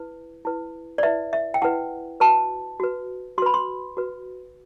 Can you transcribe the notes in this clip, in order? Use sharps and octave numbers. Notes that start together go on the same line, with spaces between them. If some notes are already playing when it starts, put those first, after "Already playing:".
Already playing: E4 B4
E4 B4
D5
E4 B4 E5
E5
G5
E4 B4 F#5
F#4 B4 A5
F#4 B4
F#4 B4 B5 C6
C6
F#4 B4